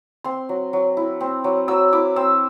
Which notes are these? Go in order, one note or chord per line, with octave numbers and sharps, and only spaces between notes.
C4 C6
F#3
F#3
E4
C4
F#3
F#3 E6
E4 D6
C4 E6